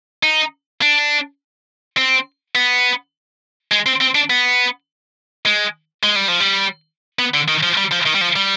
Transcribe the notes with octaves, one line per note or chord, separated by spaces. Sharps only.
D#4
D4
C4
B3
G#3
C4
C4
D4
B3
G#3
G#3
G3
F3
G3
B3
D3
D#3
F3
G3
F3
D#3
G3
F3
G3